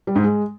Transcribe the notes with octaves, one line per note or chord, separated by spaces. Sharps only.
G3
G#2
G#3